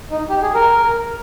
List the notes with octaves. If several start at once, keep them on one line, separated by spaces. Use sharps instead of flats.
D#4
G4
G#4
A#4